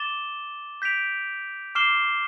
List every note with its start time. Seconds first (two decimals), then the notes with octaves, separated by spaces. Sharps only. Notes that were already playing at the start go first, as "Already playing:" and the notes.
Already playing: D6 A6 E7 G7
0.82 G6 B6 D7 F7
1.75 D6 F6 C7 E7 G7